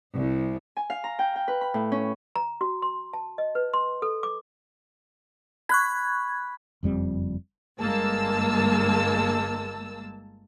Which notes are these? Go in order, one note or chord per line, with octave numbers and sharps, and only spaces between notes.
C2
G#5
F5
A#5
G5
G5
B4
B5
A2
C#4
A#5
F#4
C6
A5
D#5
B4
C6
A4
D6
B5 C#6 F#6 G#6
F#1 F2 G3 C4
G1 G2 G#3 A#3 A5 E6